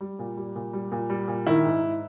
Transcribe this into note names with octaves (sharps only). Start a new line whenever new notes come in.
G3
A#2
G3
A#2
G3
A#2
G3
A#2
D#3 E4
G#2
G#2